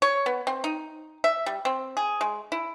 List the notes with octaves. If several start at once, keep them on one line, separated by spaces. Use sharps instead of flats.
C#5
B3
C4
D#4
E5
G3
C4
G#4
G#3
E4